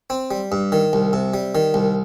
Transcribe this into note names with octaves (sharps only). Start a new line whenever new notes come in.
C4
G3
G2
D#3
C2
C3
G3
D#3
C2